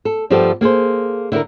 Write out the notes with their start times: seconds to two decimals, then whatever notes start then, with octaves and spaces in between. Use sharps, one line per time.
0.05 A4
0.30 G2 F3 G3 B3 G4 A4
0.61 A#3 G#4 A4 C5
1.32 D3 E4 G4 A#4